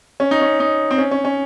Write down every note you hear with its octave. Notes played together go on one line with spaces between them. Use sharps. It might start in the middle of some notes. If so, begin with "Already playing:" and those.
C#4
D#4
C#4
D#4
C4
C#4
C#4
C#4